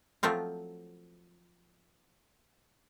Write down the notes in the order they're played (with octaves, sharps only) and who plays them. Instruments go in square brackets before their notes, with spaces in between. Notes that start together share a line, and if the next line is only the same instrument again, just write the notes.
[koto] F3 F#3 A3 C4 F4